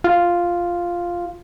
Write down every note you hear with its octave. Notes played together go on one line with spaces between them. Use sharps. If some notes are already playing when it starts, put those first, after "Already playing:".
F4